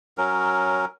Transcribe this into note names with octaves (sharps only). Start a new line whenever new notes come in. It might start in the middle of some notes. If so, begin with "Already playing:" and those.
F#3 C#4 A#4